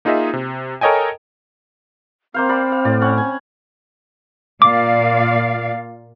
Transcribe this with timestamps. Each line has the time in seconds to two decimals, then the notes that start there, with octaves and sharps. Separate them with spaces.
0.05 A#3 D#4 F4 G#4 D#5 E5
0.33 C3
0.81 A4 A#4 C#5 D#5 G5 G#5
2.34 A#3 C4 C5 F5
2.49 D5 F5 B5
2.72 F5
2.85 A2 D5
3.01 C#4 F#5
3.17 G#5
4.62 A#2 D5 F5 D6